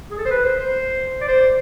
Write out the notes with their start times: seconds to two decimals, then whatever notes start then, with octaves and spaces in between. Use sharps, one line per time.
0.11 G#4
0.18 A4
0.25 C5
0.31 B4
0.45 C5
0.59 C5
1.21 D5
1.28 C5